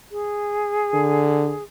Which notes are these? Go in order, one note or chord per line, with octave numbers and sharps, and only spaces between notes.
G#4
D3